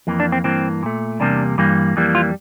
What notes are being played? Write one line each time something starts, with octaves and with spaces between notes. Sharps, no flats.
F2 E3 A#3
D4
C4
G2 E3 A#3 C4
A#2 A3
E2 C3 G3 A#3 D4
G2 E3 G3 A#3
F2 E3 G3 A#3
F4